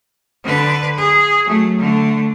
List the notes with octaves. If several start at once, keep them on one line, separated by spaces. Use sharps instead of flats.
D3 B4
G#4
F#3 A3
D3 A3